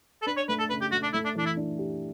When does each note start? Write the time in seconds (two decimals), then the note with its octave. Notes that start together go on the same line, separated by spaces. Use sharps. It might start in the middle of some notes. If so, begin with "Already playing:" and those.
0.22 A4
0.26 D4 B4
0.37 C#5
0.48 A3 B4
0.59 A4
0.70 C#3 B4
0.81 G4
0.92 A3 F#4
1.03 D4
1.13 A3 E4
1.25 D4
1.35 E3 D4
1.46 E4
1.57 D4
1.79 G4